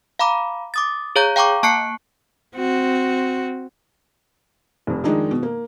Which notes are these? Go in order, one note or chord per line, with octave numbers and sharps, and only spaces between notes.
F5 A#5 B5 D6
D6 D#6 A6
G#4 C#5 F5 A#5 G6
F5 G5 A#5 C#6 D6
A#3 A5 C#6 F#6 C7 C#7
C4 F#4
F1 F2
D#3 F3 G#3 D4 D#4 G#4
B2
A#3